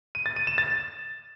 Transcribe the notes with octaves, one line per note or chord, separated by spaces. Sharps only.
D#7
A6
D#7
E7
A6